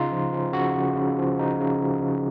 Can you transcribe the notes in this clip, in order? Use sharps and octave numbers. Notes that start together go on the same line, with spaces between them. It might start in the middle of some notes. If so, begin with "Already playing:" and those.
Already playing: C#3 D#4 F4
F3
F3
C#3 F#4
C#3
C#3
F3
D#4
C#3
F3
C#3